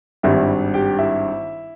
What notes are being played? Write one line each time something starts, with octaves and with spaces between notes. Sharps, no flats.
G#1 G2 G3 E4 E5
G4 G5
E4 E5